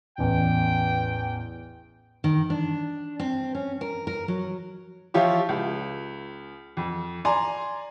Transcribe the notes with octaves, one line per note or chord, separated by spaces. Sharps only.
A1 E2 G5
D#3
D4
C4
C#4
A#4
A#4
F#3
F3 E4 F4 G4 C#5
C#2
F2
D5 G#5 A#5 C6